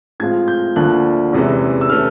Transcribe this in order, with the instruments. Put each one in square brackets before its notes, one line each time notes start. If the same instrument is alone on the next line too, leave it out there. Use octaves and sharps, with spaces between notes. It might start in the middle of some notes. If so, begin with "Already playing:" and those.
[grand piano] A2 F3 G#3 C4 F4 G#6
G6
D2 D3 F3 A#3 D4 F#6
E2 C3 E3 G#3 C#4
E6
C3 E3 A3 C#4 F6